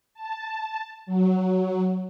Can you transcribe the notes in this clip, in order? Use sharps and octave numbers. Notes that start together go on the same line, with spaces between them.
A5
F#3